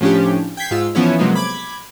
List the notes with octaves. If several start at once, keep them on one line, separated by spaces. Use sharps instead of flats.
A2 F3 C#4 D4 G4
G5 G6 G#6 B6 C7
G#2 F4 E6
E3 F3 B3 C#4 E4 C#5
C3 F3 F#3 G#3 A#3 B3
B5 D6 G#6